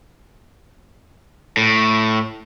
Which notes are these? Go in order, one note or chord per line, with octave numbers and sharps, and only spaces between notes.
A2